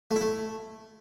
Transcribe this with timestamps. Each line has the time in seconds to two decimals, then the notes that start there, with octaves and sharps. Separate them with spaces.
0.11 A3
0.16 E4
0.21 A3